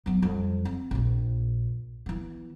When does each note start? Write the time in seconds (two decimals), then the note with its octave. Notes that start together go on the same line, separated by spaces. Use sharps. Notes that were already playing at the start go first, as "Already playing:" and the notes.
0.06 F#3 B3
0.22 F2 G3
0.65 C4
0.91 A#1 A#2
2.06 E3 B3